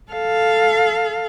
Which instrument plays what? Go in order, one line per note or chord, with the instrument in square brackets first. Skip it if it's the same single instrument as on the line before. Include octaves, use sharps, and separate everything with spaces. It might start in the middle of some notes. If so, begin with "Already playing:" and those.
[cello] A4 F5